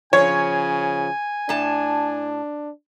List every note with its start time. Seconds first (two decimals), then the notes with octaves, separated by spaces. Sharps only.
0.13 C#3 F3 C#5 G#5
1.49 A2 D4 A5